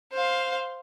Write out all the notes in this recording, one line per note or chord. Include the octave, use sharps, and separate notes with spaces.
C5 F5